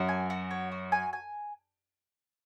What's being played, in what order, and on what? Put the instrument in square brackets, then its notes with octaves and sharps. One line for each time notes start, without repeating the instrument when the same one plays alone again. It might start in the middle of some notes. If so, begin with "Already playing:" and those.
Already playing: [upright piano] F#2 [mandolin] F#4
[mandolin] G#5
F#4
C#5
F#4
G#5
G#5